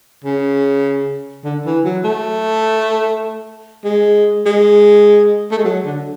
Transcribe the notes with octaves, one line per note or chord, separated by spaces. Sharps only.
C#3
D3
E3
F#3
A3
G#3
G#3
A3
G#3
F#3
D3